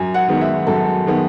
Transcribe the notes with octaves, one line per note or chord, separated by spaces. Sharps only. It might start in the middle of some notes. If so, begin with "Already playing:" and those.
Already playing: F#2 G#5
F#5
D#3 G#3 B3
E5
F#2 A4
D#3 G#3 B3